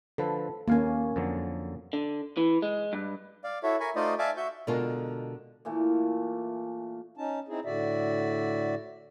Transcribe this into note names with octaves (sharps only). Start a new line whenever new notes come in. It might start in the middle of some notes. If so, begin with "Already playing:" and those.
D3 F3 A4 B4
D#2 A#3 C#4 F5 G#5
F2 D3 F#3
D3
E3
G#3
G2
D5 F5
E4 F#4 A4 C#5 E5
A#4 G#5 B5 C#6
A3 D#4 F4 C5 D5 D#5
D5 E5 F5 G#5 A5 D6
F#4 E5 C#6 G6
B2 D3 G#3 F4 A4 A#4
A#2 E3 A3
C#4 D#4 A5
C4 D#4 E4 G#4
A2 D3 F#4 D5 E5